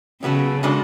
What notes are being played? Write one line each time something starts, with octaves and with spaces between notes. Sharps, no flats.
C#3 F#3 B3 F#4 A4
C#3 G#3 D4 F#4 A4